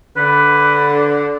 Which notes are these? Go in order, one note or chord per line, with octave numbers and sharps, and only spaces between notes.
D3 B4